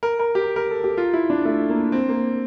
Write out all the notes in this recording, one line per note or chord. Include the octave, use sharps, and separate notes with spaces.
A#4
A#4
G4
A#4
A4
G4
F4
E4
D4
A3
A#3
C4
A#3